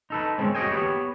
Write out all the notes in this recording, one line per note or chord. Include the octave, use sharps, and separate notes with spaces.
D#4 A4 B4
G#3 C4 C#4
F#4 G#4 C#5 D#5 G5 G#5
B3 G4 B4 C#5